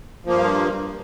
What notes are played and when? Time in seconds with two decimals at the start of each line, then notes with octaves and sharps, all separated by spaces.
0.25 F3
0.27 A#3
0.30 G2